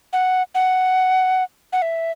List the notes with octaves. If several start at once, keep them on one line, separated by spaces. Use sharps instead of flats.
F#5
F#5
F#5
E5